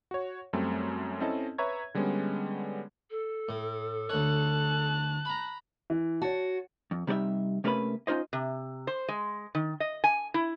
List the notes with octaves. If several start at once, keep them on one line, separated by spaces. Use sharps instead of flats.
F#4 C#5
F#2 G3 A3 C4
C4 C#4 E4 A4 D#5 A5
B4 C#5 E5 A#5 C#6 G#6
D3 G3 G#3 B3 C#4
A4
A2
D2 C#5 A5 F#6
A#5 B5
E3
F#4 C#5 A5
F2
C3 G3 D#4 D5 E5
C3 A3 A#3 C#4 B4 B5
C#4 D#4 F4 C5 D#5
C3
C5
G#3
D#3
D#5
G#5
E4